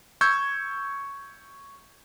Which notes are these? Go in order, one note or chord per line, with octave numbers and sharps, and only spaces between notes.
C#6 E6 G6 G#6